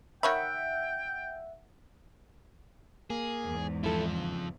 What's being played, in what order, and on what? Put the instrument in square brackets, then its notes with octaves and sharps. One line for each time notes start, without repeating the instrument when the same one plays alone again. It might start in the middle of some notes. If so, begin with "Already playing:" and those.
[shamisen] D#3 C#5 B5 [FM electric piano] E5 F#5 [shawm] G5
[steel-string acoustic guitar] A#3 [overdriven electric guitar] G#4
[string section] E2 G#2
[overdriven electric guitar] F2 F3 [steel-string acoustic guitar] E4 A4
[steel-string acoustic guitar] C#3